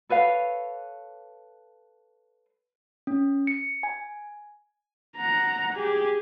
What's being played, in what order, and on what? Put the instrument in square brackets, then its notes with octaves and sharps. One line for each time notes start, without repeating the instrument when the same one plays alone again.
[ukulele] A4 B4 C#5 F5
[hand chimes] C#4
C#7
G#5
[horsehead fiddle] F#5 A#5
G4 G#4